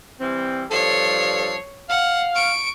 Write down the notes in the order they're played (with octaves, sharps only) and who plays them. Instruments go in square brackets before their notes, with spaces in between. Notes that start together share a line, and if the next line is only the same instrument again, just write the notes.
[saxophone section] E3 G3 C4
[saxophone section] G2 F3 A4 [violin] C#5 C7
[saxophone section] F5 [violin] F#5
[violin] C#6 D7